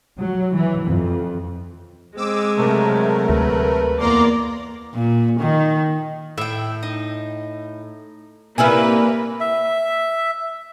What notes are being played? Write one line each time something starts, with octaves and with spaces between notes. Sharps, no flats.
F#3
E3
F2
G#3 C4 D6 E6
C3 F#3 A3 A#4
D2 B4
E2 A#3 D5 A#5 C6
A#2
D#3
A2 E5 G5
D#4
C3 G3 A#3 E4 B4 G#5 E6 F6
E5